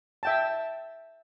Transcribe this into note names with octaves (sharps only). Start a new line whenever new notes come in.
E5 G5 A5